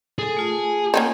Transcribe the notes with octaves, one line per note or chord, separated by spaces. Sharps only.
G#4 A4
A3 F4 G#5
A#3 C#4 D#4